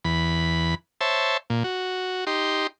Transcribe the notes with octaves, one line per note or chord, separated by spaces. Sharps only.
E2 B5
C5 C#5 E5 A5
A#2
F#4
D#4 G4 C6